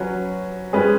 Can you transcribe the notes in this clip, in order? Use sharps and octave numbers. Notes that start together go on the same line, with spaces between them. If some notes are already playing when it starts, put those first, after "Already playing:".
Already playing: F#3 C#4 F#4 B4
G#3 C#4 G#4 B4